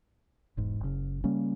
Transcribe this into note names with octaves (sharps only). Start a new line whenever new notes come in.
E1 G#2
F#1 C#3
C#3 G3 A#3 C#4